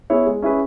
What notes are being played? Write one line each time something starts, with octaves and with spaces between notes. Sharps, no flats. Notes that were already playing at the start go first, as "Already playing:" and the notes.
B3 E4 G#4 C#5
G#3
C#4 E4 G#4 B4